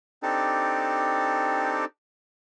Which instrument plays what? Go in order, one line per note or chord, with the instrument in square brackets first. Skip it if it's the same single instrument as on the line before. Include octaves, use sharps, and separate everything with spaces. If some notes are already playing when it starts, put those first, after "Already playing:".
[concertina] C4 D4 D#4 G4 A4